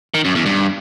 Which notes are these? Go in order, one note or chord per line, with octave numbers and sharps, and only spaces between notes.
D#3
F#2
E2
G2